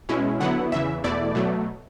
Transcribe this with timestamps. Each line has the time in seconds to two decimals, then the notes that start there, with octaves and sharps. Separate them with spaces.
0.09 B2 G#3 C#4 E4
0.40 D3 F#3 B3 E4 F#5
0.72 E2 C#3 E3 E5
1.04 E2 B2 A3 E4 D5
1.35 B2 F#3 A3